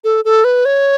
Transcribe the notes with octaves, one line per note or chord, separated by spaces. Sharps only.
A4
A4
B4
C#5